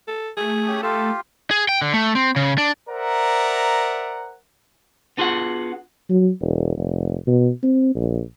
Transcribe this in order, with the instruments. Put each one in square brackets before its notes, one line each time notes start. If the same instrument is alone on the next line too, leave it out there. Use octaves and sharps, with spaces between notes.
[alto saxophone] A4
[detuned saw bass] A3 [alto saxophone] G#4
[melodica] C#4 G4 D#6
[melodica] F4 G4 F5 [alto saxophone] A4
[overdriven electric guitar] G#4
G5
D3
A3
C4
C#3
D4
[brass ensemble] A#4 C5 D5 E5 F#5 A#5
[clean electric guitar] B3 D4 F4 F#4 G#4 F#5
[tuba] F#3
E1
F1
B2
C4
A#1